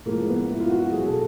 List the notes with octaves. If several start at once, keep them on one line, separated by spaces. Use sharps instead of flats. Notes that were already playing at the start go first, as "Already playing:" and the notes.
A2 F3 G#3 A#3
B3
E4
F4
F#4
B2 F#3 G#4
A4